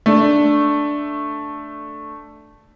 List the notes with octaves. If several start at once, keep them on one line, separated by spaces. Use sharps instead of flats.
A3 D4